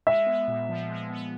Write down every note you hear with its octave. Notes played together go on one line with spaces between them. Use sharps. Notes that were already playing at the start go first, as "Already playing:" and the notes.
G#3 E5
B3
A#2
F3
G#3
B3